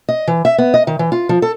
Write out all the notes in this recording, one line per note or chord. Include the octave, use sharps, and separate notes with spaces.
D#5
E3
E5
B3
D#5
D#3
E3
F4
F3
A4